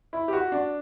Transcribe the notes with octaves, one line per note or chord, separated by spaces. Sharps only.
E4
G4
F#4
D4